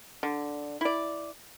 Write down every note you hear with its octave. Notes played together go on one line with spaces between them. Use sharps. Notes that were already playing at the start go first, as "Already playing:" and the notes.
D3
E4 D5